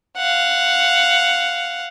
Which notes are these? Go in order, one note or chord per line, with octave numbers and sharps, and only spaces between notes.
F5 F#5